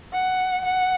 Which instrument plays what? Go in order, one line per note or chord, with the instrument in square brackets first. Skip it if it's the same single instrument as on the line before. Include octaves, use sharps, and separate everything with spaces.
[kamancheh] F#5
F#5